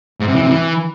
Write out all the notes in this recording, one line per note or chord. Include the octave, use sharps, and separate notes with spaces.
G#2
C3
E3
C3
E3